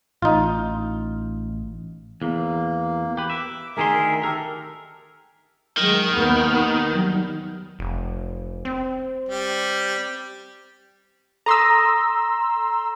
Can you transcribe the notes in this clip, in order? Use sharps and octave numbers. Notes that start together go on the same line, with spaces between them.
A1 D#4 F4
E2 A#3
G4 B4
E5 D6
D2 D#3 G#4 A#4 E5 C6
G4 A4 A#4
D#3 F#3 G#3
D#2 B3
F#3 G3
F1
C4
G3
A4 A#5 C6 D#6 E6 A#6